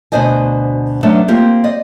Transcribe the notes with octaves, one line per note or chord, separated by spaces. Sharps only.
D2 B2 D4 C5 D#5 G#5
F#3 A3 B3 C#4 D4
A#3 C4 F4 G4
D5 D#5